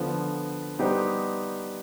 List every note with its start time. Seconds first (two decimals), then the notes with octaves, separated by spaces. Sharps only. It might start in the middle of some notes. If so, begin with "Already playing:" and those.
Already playing: D3 F3 B3
0.79 G3 B3 D#4 G4 C5